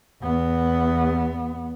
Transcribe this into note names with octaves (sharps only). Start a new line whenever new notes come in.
E2 B3